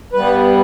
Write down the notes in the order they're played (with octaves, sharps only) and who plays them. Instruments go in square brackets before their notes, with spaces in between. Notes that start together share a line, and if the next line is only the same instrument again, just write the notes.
[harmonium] G2 G3 B3 B4